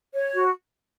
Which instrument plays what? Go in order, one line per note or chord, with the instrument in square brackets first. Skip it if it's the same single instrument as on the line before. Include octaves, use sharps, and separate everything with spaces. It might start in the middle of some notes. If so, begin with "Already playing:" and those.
[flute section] C#5
F#4